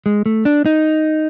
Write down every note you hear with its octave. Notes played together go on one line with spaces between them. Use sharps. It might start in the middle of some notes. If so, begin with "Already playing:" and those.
G#3
A3
D4
D#4